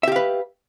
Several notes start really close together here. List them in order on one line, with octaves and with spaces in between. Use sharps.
E5 G4 F5 B4